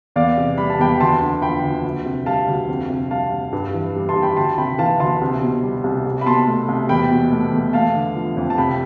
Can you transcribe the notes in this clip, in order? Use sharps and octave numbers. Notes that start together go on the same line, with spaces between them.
E2 D5 F5
C3
G3 B5
A5
E2 G5 B5
D2 A5 C6
D3
F3 G5 B5
D2
D2
C3
G3 F5 A5
D2
F2
C3
G3 F5 A5
F2
G2
E3
G3
A5 C6
G2
G5 B5
D2 A5 C6
C3 G5 B5
E3 F5 A5
D2 A5 C6
C2
B2
G3
C2
C2
B5
B2 A5 C6
A3
C2
E2 G5 B5
B2
A3
E2
A3 F5 A5
D3
F3
F2
A5
C2 G5 B5